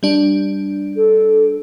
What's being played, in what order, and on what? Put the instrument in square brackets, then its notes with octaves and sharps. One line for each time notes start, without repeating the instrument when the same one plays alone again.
[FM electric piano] G3 D4
[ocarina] A4